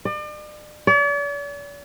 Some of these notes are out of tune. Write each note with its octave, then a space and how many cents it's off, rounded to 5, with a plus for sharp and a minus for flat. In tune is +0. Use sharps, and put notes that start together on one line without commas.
D5 +40
D5 -45